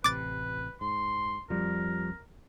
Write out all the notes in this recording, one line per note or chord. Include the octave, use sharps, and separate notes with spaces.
A1 C3 B4 D6 A6
G#2 C6
F2 F3 G3 A#4